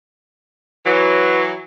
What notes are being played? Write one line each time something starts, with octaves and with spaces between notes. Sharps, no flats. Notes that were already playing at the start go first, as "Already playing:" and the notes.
E3 F#3